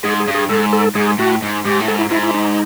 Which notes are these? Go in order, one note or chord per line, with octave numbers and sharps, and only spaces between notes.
G#2 G#4
G#4
G2
G#4
G#2 A4
A4
G#2 G#4
A2 F#4
G#2
G#2 G4
A2
G#2 A4
E4
G#2 E4
E4
D#4